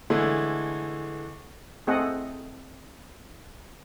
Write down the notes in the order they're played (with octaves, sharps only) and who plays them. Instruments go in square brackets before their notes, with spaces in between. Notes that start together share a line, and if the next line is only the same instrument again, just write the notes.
[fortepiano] D3 E3 G#3 A3
[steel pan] A3 C4 G#4 A4 D#5 F#5